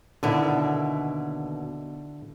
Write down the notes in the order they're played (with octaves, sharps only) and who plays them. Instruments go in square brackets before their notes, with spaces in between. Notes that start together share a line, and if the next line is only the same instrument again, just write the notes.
[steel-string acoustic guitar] D#2 B2 [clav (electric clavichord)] D3 E4